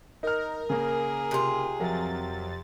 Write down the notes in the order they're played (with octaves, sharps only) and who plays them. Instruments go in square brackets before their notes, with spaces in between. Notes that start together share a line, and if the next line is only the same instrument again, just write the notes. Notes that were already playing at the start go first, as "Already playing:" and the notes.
[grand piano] D#4 F6 [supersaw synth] A#4
[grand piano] C#3 A#3 [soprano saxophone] G#4
[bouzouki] C3 F4
[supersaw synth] F2 A6 [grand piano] F#3 A#4 E5